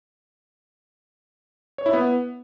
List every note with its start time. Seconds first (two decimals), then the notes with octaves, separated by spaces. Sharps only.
1.78 C#5
1.86 E4
1.93 B3